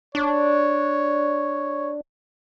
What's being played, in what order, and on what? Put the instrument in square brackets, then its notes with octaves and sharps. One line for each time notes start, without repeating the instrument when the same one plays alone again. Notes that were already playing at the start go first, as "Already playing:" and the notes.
[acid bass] D4 [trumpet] C#5